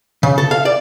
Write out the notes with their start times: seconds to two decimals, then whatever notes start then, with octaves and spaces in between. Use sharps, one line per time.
0.23 C#3
0.38 A4
0.51 F5
0.65 D5